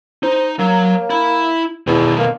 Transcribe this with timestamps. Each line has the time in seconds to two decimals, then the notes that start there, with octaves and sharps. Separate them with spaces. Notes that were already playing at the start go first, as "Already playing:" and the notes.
0.23 D#4 C5
0.59 F#3 A#3
1.10 E4 B5
1.87 E2 B2 D#3
2.18 A#3